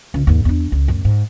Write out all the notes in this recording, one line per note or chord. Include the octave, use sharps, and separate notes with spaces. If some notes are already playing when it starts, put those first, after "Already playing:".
C#2
D#2 G#2
E2 D4
C#2
F#2 A2
G#2